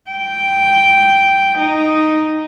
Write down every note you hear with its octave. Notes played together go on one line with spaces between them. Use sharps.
G5
D#4